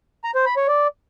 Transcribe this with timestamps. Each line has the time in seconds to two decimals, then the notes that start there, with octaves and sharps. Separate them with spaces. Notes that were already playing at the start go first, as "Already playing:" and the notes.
0.24 A#5
0.35 C5
0.46 B5
0.57 C#5
0.68 D5